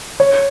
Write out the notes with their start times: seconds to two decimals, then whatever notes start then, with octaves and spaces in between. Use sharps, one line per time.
0.20 C#5